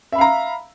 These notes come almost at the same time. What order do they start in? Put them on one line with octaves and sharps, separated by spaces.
E5 B5 F5 A#5